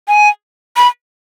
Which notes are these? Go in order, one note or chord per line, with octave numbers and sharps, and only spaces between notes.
G#5
B5